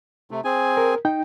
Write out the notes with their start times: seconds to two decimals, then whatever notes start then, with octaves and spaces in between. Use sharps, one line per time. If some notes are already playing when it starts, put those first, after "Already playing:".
0.31 C3 A3
0.44 C4 G#4 G#5
0.77 A#4
1.05 D#4 G5